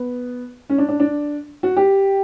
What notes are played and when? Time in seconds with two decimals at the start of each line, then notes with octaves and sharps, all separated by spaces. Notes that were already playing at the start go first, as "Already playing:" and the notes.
Already playing: B3
0.70 C#4
0.78 D4
0.89 D4
1.00 D4
1.63 F#4
1.77 G4